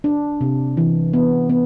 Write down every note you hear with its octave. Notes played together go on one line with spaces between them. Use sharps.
D4
C3
E3
B3
B3